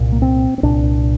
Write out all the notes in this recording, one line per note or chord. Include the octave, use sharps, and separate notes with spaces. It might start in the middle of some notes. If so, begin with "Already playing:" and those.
Already playing: C2 A#2
A#3
C4
C4
C2 A#2 D4